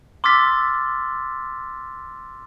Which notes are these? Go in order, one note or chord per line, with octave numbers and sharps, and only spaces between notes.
C6 D6 E6 F6 A6 B6